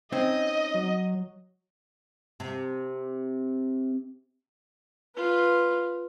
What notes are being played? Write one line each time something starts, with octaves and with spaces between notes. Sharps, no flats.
C4 C#4 D#4 D#5
F#3
C3
F4 B4